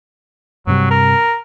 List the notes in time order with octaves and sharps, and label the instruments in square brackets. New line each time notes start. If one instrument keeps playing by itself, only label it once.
[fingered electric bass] G2 C3 G3 [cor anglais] F#3
[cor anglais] A#4